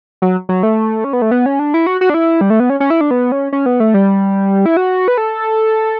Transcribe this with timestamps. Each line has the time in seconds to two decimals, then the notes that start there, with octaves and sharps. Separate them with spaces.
0.22 F#3
0.49 F#3
0.63 A3
1.04 C#4
1.13 B3
1.22 A3
1.31 B3
1.46 C#4
1.59 D4
1.74 E4
1.87 F#4
2.01 F#4
2.10 D4
2.14 E4
2.41 G3
2.50 A3
2.60 B3
2.70 C#4
2.80 C#4
2.90 E4
3.01 D4
3.11 B3
3.32 C#4
3.52 C#4
3.66 B3
3.80 A3
3.94 G3
4.66 E4
4.77 F#4
5.08 B4
5.18 A4